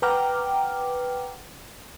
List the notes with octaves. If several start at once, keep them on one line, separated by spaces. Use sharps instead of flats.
B4 F#5 G5 A#5 D6 F6